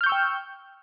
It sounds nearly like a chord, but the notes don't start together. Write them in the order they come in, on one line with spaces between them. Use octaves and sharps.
F6 G6 C#6 E6 G5